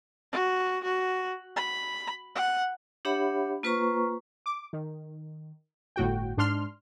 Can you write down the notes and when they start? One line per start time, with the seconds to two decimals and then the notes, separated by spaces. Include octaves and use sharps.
0.32 F#4
0.83 F#4
1.56 B5
2.35 F#5
3.05 D4 G4 C#5 E5 F#5 B5
3.63 A#3 F4 B4 C5 A#5 C#6
4.46 D6
4.73 D#3
5.96 G1 A2 F#4 G5
6.37 G#2 D4 C6 F6